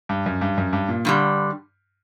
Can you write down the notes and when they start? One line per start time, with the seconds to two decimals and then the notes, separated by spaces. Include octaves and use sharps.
0.09 G2
0.26 F#2
0.41 G2
0.58 F#2
0.73 G2
0.89 A#2
1.05 G2 D3 G3